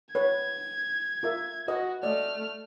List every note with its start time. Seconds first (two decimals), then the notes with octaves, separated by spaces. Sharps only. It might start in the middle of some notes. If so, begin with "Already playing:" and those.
0.15 B4 C#5 G#6
1.23 F4 A#4 E5
1.68 F#4 B4 D#5
2.03 A3 D5 D#5 F6